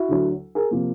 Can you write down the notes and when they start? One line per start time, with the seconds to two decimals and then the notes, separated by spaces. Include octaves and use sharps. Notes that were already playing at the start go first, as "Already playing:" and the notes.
Already playing: E4 F#4
0.09 D2 D3 F#3
0.55 G#4 A#4
0.71 C3 F3 A#3